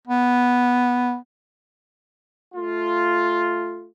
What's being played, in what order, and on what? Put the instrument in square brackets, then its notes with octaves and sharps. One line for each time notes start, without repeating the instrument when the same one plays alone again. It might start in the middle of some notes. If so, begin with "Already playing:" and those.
[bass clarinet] B3
[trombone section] A3 F4